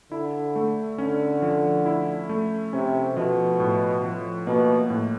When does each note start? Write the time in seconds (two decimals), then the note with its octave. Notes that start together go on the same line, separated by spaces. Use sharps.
0.12 D3 E4
0.56 A3
0.98 D3 C#4
1.42 F3
1.86 E4
2.29 A3
2.73 C3 C#4
3.16 B2 F3
3.60 A2
4.03 F3
4.47 B2 A#3
4.90 A2